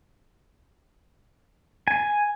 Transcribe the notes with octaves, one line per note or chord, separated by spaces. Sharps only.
G#5